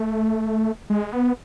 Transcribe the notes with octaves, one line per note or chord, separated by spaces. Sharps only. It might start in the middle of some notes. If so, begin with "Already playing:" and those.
Already playing: A3
G#3
B3